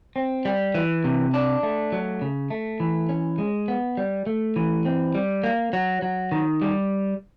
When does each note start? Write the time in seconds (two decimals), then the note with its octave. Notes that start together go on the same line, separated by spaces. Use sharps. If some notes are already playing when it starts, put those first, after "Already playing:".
0.16 C4
0.45 G3
0.75 E3
1.04 C3
1.34 D4
1.63 A3
1.92 F#3
2.21 C#3
2.50 A3
2.80 E3
3.09 C#4
3.38 G#3
3.68 B3
3.97 G3
4.27 A3
4.56 E3
4.85 C4
5.15 G3
5.44 A#3
5.73 F#3
6.02 F#3
6.32 D#3
6.62 G3